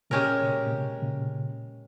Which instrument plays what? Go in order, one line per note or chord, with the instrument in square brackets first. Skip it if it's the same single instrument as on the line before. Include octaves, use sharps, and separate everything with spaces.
[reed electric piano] A#2 C#3 [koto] G#3 C#4 G4 A#4
[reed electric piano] A#2 C#3
A#2
C3
A#2 C#3